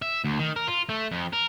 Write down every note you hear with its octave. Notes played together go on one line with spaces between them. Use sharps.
E5
D2
D#3
A#4
F4
A3
F2
A#4